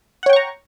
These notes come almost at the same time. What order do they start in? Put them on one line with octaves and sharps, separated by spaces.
F#5 C#5 G5 C#6 A#5